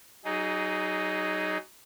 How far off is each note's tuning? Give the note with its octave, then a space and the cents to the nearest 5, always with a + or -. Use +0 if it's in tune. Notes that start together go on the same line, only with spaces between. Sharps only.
F#3 +30 D#4 +0 G#4 +0